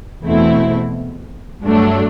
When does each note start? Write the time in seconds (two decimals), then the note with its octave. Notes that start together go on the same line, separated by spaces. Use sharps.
0.24 E2 B2 A3 C4 E4
1.63 G2 F#3 A3 D4